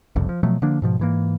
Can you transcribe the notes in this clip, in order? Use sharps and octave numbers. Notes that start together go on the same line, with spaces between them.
F#1 C2 F2
F3
B2 F3 F#3 A3
D3 F3 A#3 D4
G#2 B2 F3
G#2 E3 A#3